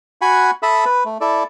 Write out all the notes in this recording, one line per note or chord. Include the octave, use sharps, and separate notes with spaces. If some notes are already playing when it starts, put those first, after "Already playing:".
F#4 F#5 G#5 B5
A4 E5 A5 B5 D#6
B4
A3
E4 A4 D5